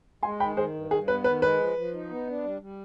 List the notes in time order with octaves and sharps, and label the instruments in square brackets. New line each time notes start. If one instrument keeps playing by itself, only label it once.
[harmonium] G#3 [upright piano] G#5 C6
[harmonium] D#3 [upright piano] G5 B5
[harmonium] D#3 [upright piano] G#4 C5
[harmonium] G2
[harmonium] G2 [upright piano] G#4
[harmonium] B3 [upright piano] B4
[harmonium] D#3 [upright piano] B4
[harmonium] G#3 [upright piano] B4
[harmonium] F3
F3
D#4
B3
D4
G3
G3